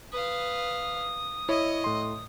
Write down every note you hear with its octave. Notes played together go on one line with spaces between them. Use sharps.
B4 F5 D#6
E4 C#5 D#5
A2 C6